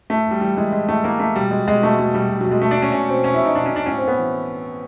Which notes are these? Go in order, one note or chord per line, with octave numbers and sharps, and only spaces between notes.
A2 A3
A2 G3
E3 G3
E3 G#3
A2 G#3
A2 A3
E3 A#3
E3 A3
B2 G3
B2 G#3
B2 G#3
B2 A3
B2 G#3
B2 G3
B2
B2 F#3
G#3
B2 A3
D4
B2 C#4
B2 C#4
B2 C4
B2 C#4
E4
B2
D#4
B2 D4
C#4
B2 D4
A2 C#4
C4
A2 B3
E3